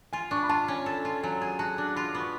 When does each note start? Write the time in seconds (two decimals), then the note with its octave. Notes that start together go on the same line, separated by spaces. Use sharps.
0.13 F4 G#5
0.31 D4 C#6
0.43 B5
0.49 F4 A5
0.68 C#4
0.86 A4
1.05 F4
1.23 F#3 G#5
1.42 G#4
1.59 F#4 A5
1.78 D4
1.96 F4 B5
2.08 D6
2.15 B3
2.20 C#6